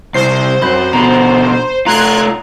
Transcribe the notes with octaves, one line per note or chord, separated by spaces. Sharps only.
C2 C5 C7
F#2 C4 B5 G6
B2 D3 A#5 B5
A3 F4 A#5 C6 F#6 G#6